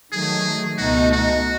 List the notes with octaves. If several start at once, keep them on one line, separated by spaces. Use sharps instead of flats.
D#3 F#3 A3 G#4
C#2 B2 A3 D#4 F#4
F#4